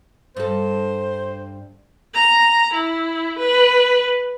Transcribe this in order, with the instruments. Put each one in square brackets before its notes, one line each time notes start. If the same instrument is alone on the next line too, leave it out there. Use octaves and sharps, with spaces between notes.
[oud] G2 A4 [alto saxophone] C5
[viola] A#5
E4
B4